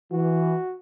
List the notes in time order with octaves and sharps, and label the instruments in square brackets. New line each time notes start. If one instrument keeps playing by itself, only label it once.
[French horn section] E3 [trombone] F#4